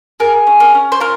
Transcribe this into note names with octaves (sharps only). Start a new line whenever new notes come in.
G#4 A#4
C#4
A#4
C#4
C5
F4 A#4